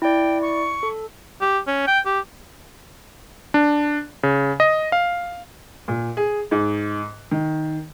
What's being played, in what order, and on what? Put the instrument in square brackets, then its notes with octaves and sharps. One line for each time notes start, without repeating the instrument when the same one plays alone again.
[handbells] E4 D5 [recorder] G5
[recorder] C#6
[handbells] A4
[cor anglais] G4
C#4
G5
G4
[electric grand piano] D4
C#3
D#5
F5
[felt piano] A#2
G#4
G#2
D#3